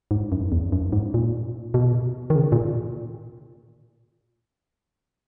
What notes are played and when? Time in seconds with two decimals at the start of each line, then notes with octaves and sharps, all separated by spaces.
0.11 G#2
0.32 F#2
0.52 E2
0.72 F#2
0.93 G#2
1.14 A#2
1.74 B2
2.30 D#3
2.36 C#3
2.52 A#2